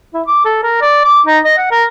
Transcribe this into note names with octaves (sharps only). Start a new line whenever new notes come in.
E4
D6
A4
A#4
D5
D6
D#4
D#5
F#5
A#4